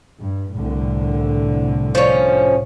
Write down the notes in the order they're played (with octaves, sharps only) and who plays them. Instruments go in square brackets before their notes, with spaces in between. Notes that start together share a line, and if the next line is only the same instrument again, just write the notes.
[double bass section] G2
C2 A2 D3
[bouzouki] F3 C#4